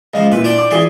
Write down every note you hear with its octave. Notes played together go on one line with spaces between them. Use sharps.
C#2 F3 D#5 F5
A#2 E4 B4
D4 D5 G5
D6
E3 E4 G#4 D5 C6